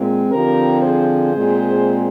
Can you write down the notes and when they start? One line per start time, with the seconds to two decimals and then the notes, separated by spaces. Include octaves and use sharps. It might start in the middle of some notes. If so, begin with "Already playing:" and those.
Already playing: A#2 G#3 C4
0.30 D3 F3 C4 G4 A#4
0.81 G#4 C5
1.32 A#2 G#3 C4